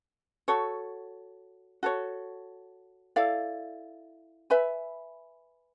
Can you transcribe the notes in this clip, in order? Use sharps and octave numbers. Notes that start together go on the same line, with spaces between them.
F#4 A4 C#5
F#4 A4 C#5
E4 A4 D5 F5
B4 E5 G#5 B5